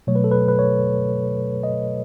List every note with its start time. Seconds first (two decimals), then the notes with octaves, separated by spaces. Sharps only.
0.07 B2 F#3 A3 C#5
0.15 B4
0.24 A4
0.31 B4
0.48 B4
0.59 C#5
1.63 D#5